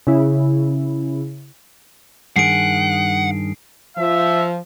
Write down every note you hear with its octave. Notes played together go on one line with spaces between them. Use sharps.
C#3 E4
G2 D#3 G#4 F#5 C7 D7
F3 E5